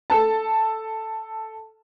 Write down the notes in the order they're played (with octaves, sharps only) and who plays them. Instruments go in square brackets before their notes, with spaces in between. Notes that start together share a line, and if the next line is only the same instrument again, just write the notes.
[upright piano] A4 A5